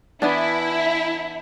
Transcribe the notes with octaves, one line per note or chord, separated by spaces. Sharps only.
E3 B3 D4 E4